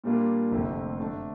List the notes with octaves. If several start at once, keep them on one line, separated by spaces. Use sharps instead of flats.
A#2 G3 A#3 D4 F4
F1 F2 D3 A3 C4
D3 A3 D4